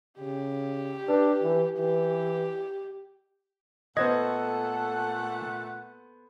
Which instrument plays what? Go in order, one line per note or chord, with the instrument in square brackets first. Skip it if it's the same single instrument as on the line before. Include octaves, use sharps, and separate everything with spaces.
[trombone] C#3 [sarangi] G4
[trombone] D4 [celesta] B4
[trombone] E3
[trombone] E3 [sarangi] G4
[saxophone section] A#2 A3 F#5 [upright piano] B3 C5 G#6 [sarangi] A4 [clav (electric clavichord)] D#5